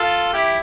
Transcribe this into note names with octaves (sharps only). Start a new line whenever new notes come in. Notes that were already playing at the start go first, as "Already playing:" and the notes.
Already playing: F4 A4
E4 G4